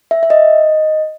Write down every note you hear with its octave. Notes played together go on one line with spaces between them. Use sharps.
E5
E5
D#5